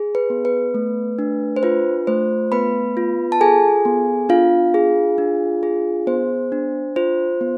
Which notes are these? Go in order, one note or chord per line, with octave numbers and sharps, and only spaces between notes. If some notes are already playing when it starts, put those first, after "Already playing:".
Already playing: G#4
B4
B3
B4
A3
D4
C5
F4 B4
A3 C5
B3 B4 B5
F4
A5
G#4 A4 G#5
B3
D4 F4 F5
G#4
D4
G#4
B3 C5
D4
F4 C5
B3